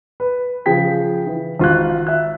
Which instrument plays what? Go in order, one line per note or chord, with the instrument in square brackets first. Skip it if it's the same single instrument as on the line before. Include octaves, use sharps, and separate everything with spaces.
[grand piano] B4
C#3 F3 G#4 G5 B6
E3
G#1 F4 F#4 F#6
E5 F#6